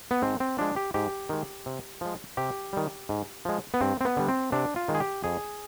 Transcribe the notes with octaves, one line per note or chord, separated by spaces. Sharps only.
B3
G#2 C4
C4
F3 G#3 D4
G4
G#2 G4
D#3 G#3
C3
F3 G#3
C3 G4
D#3 G3
G#2
F3 G#3
B3
G2 C4
C4
B3
D3 G3
C4
C3 D4
F4
D#3 G#3
G#4
G4
F2 G#4